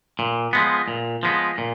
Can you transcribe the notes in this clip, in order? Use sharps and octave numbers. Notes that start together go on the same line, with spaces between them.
A#2
F3 G#3 B3
A#2
F3 G#3 B3
A#2